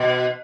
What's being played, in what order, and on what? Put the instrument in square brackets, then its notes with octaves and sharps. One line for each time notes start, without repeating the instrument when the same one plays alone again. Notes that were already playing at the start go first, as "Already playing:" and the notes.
Already playing: [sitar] B2